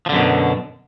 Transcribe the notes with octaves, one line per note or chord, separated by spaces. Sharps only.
F#2 B2 D3 F3